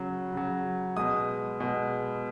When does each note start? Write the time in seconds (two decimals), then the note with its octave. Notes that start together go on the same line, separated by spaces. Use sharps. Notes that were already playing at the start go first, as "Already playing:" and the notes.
Already playing: C#3 F#3
0.33 C#3 F#3
0.97 B2 G#3 D#6
1.60 B2 G#3